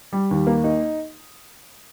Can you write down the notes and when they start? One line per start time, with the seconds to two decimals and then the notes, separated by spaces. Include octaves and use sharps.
0.13 G3
0.31 D#2
0.47 A#3
0.64 D#4